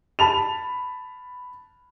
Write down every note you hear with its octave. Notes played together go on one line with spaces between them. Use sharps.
A5 B5 F7